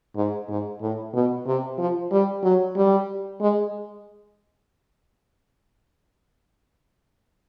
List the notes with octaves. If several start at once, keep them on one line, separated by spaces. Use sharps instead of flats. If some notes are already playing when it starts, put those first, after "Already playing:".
G#2
G#2
A2
B2
C3
F3
G3
F#3
G3
G#3